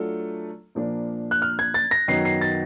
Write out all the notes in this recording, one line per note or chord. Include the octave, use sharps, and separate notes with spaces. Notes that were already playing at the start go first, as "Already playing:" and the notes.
Already playing: F#3 A3 D4 F4 A4
A#2 F3 A#3 D4
F#6
F6
G#6
A6
A#6
F#2 D#3 F#3 B3 D#4 C7
C7
A6